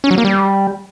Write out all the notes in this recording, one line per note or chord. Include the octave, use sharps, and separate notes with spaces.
C#4
F#3
A#3
G3